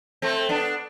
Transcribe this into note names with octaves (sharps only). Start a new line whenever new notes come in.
A3 C4
B3 D4